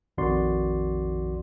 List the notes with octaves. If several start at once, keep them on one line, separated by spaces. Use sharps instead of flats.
A#1 F2 D#3 F#4 D5 C6